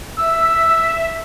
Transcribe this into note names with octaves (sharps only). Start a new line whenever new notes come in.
E5 E6